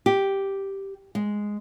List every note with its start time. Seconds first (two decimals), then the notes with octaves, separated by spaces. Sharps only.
0.06 G4
1.15 G#3